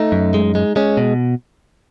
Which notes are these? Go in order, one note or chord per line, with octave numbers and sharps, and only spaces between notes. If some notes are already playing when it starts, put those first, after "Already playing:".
Already playing: A3 D#4
F#2
G#3
G#3
G#3 C#4
B2